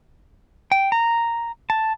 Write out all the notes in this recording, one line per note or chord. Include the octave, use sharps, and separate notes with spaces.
G5
A#5
A5